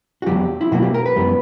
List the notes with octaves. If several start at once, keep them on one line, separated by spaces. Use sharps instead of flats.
F#4
E2 B2 F#3 G4
E4
B2 F#3 A#3 F#4
G4
A#4
B4
F#2 E3 G3 B3